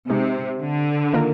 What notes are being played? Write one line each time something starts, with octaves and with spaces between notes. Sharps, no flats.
C3 G#3 D#4 G4
D3
D#3 A#3 F4 A#4